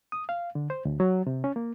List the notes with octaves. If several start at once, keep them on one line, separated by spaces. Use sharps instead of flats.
D#6
F5
D3
C5
D2
F#3
C3
C#4
A#3